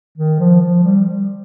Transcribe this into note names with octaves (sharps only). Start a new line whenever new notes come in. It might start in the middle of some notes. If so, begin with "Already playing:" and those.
D#3
F3
F3
G3